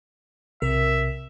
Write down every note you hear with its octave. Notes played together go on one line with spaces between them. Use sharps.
B1 C3 A#4 E5